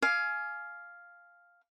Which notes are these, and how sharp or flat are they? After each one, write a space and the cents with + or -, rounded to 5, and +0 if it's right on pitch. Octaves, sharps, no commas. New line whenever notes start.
F5 +0 G#5 +20 D6 +0